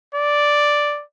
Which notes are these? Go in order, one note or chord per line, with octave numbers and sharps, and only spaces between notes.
D5